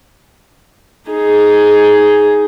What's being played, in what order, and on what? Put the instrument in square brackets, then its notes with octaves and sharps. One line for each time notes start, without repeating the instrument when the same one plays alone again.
[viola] D#4 G#4